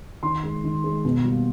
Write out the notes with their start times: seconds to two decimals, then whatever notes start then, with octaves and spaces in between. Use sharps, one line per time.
0.23 D#3 C6
0.43 G#3
0.64 D#3
0.84 G#3
1.05 B2
1.25 G3 A#3